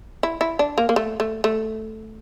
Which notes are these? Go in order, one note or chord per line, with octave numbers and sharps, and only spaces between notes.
E4
E4
D4
A#3
A#3
A3
A3
A3